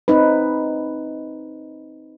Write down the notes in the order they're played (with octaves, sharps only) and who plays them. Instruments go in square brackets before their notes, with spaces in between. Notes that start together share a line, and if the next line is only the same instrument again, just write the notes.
[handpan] C4 D#4 B4